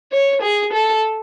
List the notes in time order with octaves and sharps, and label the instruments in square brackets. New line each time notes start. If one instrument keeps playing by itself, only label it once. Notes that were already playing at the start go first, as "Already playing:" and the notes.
[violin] C#5
G#4
A4